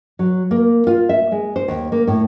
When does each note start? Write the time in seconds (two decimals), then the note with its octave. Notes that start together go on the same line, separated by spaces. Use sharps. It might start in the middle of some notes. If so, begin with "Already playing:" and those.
0.19 F#3
0.51 A#3
0.87 F4
1.09 E5
1.32 G#3
1.56 C5
1.68 D#2
1.92 A#3
2.07 A2